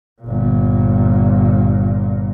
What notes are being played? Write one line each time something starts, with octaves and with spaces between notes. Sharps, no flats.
G1 A#2